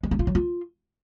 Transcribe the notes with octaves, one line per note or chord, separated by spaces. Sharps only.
G#3
C#4
F4
F#3
F4